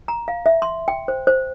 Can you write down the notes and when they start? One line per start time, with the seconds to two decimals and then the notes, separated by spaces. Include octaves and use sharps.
0.08 A#5
0.28 F5
0.46 E5
0.62 C6
0.88 G5
1.08 C5
1.27 C5